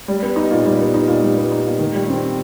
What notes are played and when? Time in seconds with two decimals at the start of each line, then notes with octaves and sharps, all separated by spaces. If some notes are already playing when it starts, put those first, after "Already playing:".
0.08 G3
0.22 B3
0.36 D#4
0.51 A#2
0.66 G3
0.80 B3
0.94 D#4
1.08 A#2
1.23 G3
1.37 B3
1.52 D#4
1.66 A#2
1.79 D#3
1.95 G3
2.09 C4